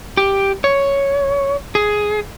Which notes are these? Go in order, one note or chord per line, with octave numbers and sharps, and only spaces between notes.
G4
C#5
G#4